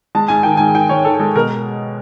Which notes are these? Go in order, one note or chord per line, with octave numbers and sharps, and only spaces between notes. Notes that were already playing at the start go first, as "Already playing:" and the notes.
G#3 A5
G#2 G#5
D#3 G5
G#5
G#2
D#3 G5
G#2 C#5
D#3 A4
G#3 A4
B2 A#4